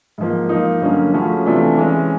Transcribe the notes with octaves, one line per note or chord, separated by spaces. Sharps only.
G#2 F3 A#3
F3 A#3 D#4
G2 D3 F#3 A#3 C#4
C#3 F3 A3 C#4 F#4
C3 E3 A3 D4 F4
E3 G#3 C#4